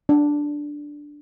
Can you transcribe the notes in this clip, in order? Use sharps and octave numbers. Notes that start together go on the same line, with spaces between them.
D4